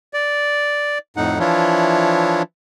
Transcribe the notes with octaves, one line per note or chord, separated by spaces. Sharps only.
D5
F2 A2 D#4 F#5
E3 F3 D4 E4 F4 C#5